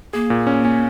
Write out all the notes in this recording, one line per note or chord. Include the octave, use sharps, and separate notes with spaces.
A#3 G#4
A#2
C#4
C#4